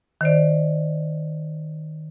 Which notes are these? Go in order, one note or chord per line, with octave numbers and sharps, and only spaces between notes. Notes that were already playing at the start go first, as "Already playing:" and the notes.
D#3 C5 D5